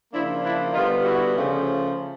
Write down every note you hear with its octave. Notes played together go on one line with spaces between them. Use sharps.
C#3 F3 A#3 D4 E4
D4 E4
D3 G3 B3 D#4 F4
E4 F#4
C#3 F3 A3